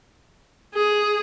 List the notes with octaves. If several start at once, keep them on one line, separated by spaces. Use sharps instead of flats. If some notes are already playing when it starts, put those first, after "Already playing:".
G#4